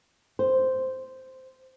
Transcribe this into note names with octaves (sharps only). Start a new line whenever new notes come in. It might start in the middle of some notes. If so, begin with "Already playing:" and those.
C5